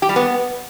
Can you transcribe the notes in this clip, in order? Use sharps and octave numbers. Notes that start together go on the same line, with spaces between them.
G4
G3
B3